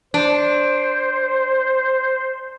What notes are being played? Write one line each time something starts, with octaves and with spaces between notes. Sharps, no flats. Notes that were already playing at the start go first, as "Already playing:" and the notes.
D4 C5